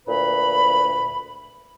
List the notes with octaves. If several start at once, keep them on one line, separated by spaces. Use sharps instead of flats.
D2 A#2 B4 B5